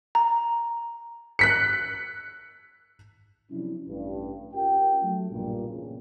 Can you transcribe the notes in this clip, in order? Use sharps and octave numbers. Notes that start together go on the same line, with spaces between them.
A#5
F#6 B6 C#7
C3 F3 F#3 C#4 D4 E4
A1 G2
C#4 F4 G4 A#4 G5
F#3 A3
B1 G2 A#2
E2 A#2 C#3